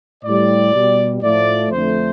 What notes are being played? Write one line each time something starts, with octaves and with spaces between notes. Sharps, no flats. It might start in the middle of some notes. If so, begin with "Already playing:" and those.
A2 G3 D5
B2 G3
A2 F3 A3 D5
F2 D3 A3 C5